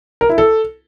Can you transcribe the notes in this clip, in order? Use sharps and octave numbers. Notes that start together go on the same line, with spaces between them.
A#4
E4
A4